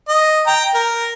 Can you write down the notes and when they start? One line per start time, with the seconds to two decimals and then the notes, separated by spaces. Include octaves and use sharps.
0.09 D#5
0.47 G5 A#5
0.74 A#4